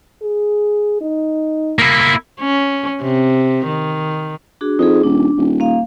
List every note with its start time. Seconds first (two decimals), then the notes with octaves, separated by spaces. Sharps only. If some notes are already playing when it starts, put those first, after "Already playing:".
0.22 G#4
1.01 D#4
1.79 A#3 E4
2.41 C#4
3.02 C3
3.66 D#3
4.61 D4 F#4 G#4
4.79 F2 D#4 G#4
5.04 D#1 D4
5.37 D#1
5.60 A#3 F5